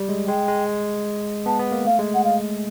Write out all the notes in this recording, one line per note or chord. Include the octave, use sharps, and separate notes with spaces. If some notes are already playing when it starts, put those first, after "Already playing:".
Already playing: G3
G#3
G#3 G5
G#3
B3 A5
B3
A#3
A3 F5
G#3
F#5
F5